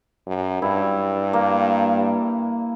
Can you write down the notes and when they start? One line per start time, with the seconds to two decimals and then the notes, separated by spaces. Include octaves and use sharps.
0.26 F#2
0.62 G2 E4
1.33 A#3